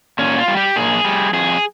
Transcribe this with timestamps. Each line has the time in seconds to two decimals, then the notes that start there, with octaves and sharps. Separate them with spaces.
0.19 A#2 C#4
0.38 F4
0.48 G3
0.57 G4
0.76 A#2 G#4
1.05 G3
1.33 F2 G#4